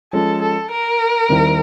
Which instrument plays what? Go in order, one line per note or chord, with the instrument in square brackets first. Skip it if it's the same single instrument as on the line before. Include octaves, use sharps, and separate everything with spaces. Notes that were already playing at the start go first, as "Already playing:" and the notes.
[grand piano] F3 G#3 C#4 [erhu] A4
[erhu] A4
A#4
[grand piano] D#2 D#3 G3 C4 E4